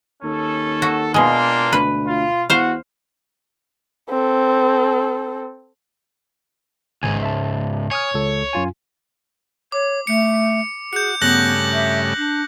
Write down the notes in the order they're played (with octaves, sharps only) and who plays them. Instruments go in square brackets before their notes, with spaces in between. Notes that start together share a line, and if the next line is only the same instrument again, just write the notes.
[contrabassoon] D#2 [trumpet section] C#4 A4
[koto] F#4
[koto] B2 G#3 [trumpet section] A#3 D4 F4
[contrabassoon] D2 [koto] B4
[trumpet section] F4
[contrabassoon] E2 [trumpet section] F#4 [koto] C5 F5
[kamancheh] C4 A4
[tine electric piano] G#1 G#5 [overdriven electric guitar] C#2 G#2
[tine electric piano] E5 A5
[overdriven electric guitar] C#5 [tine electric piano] G#5 D#6 F6
[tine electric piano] C#2 A4
F#2 F4 G#5
[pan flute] C#5 [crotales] D6
[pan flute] A3 [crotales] C#7
[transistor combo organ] F#4 [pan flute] G#4 [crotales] G6 C#7
[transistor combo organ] G2 C#3 A3 [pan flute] B3 [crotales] F#6 A#6 F#7
[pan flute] E5
D4